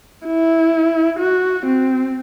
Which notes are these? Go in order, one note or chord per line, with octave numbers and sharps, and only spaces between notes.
E4
F#4
C4